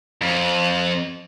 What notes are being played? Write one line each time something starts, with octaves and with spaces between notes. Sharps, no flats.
F2